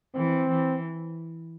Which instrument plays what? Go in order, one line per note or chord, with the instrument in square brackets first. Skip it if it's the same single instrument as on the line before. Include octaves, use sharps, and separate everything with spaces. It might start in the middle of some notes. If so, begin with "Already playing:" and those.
[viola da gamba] E3 [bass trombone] C4
[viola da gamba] E3